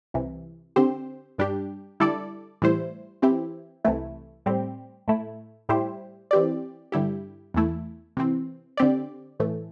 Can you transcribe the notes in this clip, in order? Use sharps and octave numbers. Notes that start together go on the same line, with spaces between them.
C2 C3 E3
D3 C4 G4 C5
G2 G3 D4 G4
D3 G3 E4 A4 D5
A2 E3 G3 E4 C5
E3 C4 E4 G4
C2 C3 E3 A3 E4
A2 G3 C4 G4
A2 A3 E4
A2 G3 E4 G4 C5
E3 C4 G4 D5
G2 D3 G3 E4 G4
E2 E3 A3 E4
C3 E3 C4
D3 C4 G4 D5
A2 E3 A3